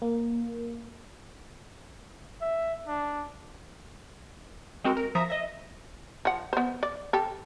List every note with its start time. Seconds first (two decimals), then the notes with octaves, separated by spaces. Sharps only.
0.02 A#3
2.41 E5
2.87 D4
4.84 G#3 C4 F#4 A#4
4.97 A#4
5.15 F3 E5 A#5 D#6 A#6 B6
5.28 D#5 E5 A#6
6.25 F3 F#5
6.53 B3 C5
6.83 D5
7.13 G4 A4